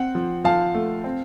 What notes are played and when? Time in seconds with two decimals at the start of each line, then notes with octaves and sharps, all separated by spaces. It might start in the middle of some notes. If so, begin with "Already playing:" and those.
Already playing: C4 F#5
0.15 F3
0.44 F3 F5 A5
0.74 A3
1.04 C4